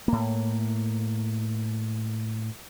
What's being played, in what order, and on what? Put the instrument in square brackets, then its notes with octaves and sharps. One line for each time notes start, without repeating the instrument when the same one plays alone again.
[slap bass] A2 A#3